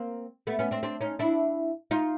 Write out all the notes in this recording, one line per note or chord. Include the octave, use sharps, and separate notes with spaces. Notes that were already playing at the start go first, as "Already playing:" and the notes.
Already playing: A#3 C4
A3 B3
B3 C#4
C4 D4
C4 D4
C#4 D#4
D4 E4
D#4 F4